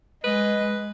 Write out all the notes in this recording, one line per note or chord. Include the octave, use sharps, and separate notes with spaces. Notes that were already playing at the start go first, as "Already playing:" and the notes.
G#3 B4 D#5